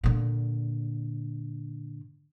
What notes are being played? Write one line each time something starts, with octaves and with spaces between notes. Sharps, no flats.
A#2 D3